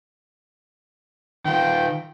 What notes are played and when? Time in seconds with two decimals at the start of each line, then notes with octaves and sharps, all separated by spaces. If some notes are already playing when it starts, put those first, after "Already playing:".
1.45 D#3 F4 G5